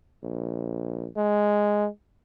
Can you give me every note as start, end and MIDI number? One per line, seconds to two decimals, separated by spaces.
0.23 1.07 34
1.17 1.88 56